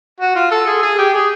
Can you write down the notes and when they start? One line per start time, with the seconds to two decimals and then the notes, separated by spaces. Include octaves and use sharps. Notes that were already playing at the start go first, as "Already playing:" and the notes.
0.20 F#4
0.35 F4
0.51 A4
0.67 G#4
0.82 G#4
0.98 G4
1.14 G#4